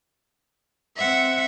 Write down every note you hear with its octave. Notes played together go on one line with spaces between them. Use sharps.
C4 E5 F#5